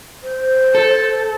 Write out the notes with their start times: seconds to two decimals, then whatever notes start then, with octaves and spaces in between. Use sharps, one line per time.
0.23 C5
0.75 A4